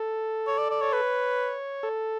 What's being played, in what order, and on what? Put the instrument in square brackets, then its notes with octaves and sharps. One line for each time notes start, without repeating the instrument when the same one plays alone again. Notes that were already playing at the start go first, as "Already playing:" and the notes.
Already playing: [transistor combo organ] A4
[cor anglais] C#5
D5
D5
[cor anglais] C#5 [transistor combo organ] D5
[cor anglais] B4 [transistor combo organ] C#5
[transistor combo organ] A4